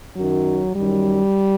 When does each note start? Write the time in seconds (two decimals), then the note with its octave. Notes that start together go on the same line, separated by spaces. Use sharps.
0.16 F#2 D#3 F#3
0.75 F#2 D#3 G3